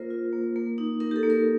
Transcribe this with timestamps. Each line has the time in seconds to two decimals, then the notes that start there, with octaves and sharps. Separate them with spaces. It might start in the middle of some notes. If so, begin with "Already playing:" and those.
Already playing: A#3 F4 A#4 C5
0.10 F4
0.33 A#3
0.56 A#3
0.78 D#4
1.00 D#4 A#4
1.11 G4
1.16 A4
1.23 A#3
1.30 A#4